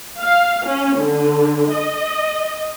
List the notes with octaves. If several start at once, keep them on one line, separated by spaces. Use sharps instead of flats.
F5
C#4
D3
D#5